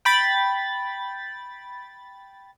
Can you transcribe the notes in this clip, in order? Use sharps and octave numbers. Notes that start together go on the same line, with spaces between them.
G5 B5 A6